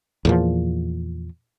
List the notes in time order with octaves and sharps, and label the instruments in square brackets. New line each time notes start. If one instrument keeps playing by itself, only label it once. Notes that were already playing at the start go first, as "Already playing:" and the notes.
[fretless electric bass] E2 A#2 F3